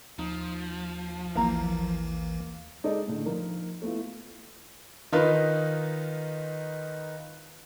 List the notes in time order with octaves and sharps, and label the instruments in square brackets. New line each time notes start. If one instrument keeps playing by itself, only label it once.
[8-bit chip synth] D#2 [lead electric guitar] F3 [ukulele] D#4
[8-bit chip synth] A1 D#2 E3 [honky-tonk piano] A#3 [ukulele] E4 A#5
[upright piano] G#3 D#4 A4 D5 D#5
A2 D3
F3 D#4 A#4
A3 B3 E4 F4
[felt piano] D#3 D#4 F4 A#4 B4